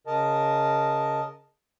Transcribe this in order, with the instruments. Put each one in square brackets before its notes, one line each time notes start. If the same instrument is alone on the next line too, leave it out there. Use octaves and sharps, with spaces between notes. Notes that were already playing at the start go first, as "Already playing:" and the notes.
[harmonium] C#3 A#4 D#5 A5